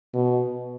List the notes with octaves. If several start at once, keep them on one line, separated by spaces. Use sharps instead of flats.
B2